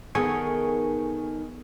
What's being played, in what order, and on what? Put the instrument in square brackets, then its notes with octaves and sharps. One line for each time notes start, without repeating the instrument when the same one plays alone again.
[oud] D#3 [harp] B3 G#4 [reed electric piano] A4 G#5 C#6